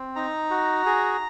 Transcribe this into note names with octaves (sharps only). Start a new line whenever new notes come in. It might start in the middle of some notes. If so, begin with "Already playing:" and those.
Already playing: C4
D#4 A#5
F#4
G#4